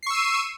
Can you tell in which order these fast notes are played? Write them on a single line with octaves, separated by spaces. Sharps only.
C7 C#6 E6 D#7